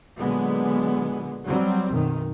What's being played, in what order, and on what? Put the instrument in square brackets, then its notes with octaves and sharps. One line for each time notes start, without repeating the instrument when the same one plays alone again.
[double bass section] A#2 D3 F#3 G#3 B3
F#3 G3 C4
B1 F#2 D#3